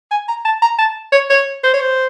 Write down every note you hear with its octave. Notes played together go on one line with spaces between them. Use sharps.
G#5
A#5
A5
A#5
A5
C#5
C#5
C5
C#5
C5